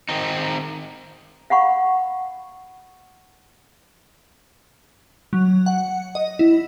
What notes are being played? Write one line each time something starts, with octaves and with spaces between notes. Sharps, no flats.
D#3 C4 D#4
F5 F#5 B5 C#6
F#3
F#5
D#5
E4